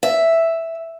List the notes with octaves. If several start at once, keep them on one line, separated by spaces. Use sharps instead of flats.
E5